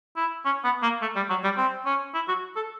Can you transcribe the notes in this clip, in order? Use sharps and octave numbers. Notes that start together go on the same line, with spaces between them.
E4
C#4
B3
A#3
A3
G3
F#3
G3
C4
C#4
E4
F#4
A4